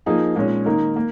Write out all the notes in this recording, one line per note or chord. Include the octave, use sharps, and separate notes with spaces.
F3 A#3 D#4 G#4
A#2 G#3 C#4
D#3 A#3 D#4 A#4
A#3